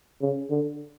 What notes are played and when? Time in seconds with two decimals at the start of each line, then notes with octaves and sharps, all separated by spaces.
0.22 C#3
0.50 D3